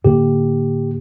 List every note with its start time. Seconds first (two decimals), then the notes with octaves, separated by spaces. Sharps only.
0.05 A2 D3 A#3 G4